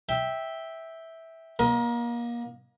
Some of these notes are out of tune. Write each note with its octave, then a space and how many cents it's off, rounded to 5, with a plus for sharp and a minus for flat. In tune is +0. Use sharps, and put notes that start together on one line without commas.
E5 -10 G5 +5
A#3 +30 A#4 +30 D#5 +0